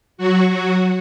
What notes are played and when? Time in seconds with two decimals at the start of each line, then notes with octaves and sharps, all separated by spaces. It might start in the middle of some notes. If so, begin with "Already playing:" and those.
0.18 F#3 F#4
0.49 F#3 F#4